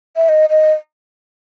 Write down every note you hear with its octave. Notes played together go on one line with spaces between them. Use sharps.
E5
D#5
D#5